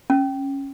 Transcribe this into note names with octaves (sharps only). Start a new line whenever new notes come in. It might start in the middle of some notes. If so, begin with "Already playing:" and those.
C#4